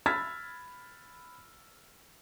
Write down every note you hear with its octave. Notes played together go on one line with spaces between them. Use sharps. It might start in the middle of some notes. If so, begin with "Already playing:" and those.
B5 E6 F6 G#6 A6 B6